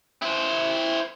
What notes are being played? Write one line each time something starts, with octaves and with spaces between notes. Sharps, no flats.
E4 C5